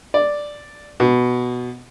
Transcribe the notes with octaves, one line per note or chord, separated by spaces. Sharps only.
D5
B2